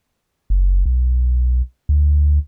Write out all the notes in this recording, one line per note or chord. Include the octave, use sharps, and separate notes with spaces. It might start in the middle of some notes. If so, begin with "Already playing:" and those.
F#1
B1
D2